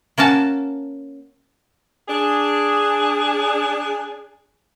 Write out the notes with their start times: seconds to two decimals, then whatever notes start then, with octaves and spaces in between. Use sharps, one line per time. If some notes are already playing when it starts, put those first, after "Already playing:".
0.18 A#3 C#4 F#4 A5
2.08 D4 G#4